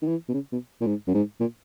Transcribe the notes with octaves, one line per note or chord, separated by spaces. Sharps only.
D#3
E3
B2
C#3
B2
A#2
G#2
F#2
G#2
A#2